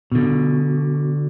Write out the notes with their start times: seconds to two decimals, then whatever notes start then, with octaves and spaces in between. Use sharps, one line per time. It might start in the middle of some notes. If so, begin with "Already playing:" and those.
0.12 B2 D3